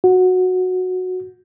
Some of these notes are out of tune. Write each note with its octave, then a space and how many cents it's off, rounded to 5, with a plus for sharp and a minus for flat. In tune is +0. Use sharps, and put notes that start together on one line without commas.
F#4 -10